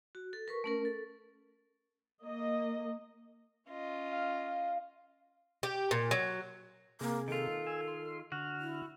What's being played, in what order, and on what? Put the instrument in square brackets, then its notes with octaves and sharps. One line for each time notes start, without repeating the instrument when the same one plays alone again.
[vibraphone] F#4
A4
A#4 B4 C#6
A3 C#4 A#4
A4
[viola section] A#3 D#5
[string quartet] C#4 F4 D#5
[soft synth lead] F5
[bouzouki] G4
A#2
F#3
[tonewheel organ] C3 G#4 [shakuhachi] A#3
[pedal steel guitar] D#3 F4 [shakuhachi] A4
[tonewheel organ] G#5 E6
C6
[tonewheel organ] D3 F6 [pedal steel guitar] F#4
[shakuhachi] E4